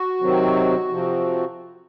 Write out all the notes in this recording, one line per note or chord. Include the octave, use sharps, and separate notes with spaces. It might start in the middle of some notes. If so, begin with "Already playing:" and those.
Already playing: F#4
C3 D#3 F#3 C4
F2 C3 F3 C4